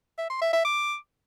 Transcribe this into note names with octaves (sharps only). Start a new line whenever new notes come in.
E5
C6
E5
E5
D6